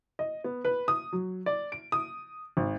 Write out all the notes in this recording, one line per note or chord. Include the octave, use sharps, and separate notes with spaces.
D#5
B3
B4
D#6
F#3
D5
D7
D#6
G#1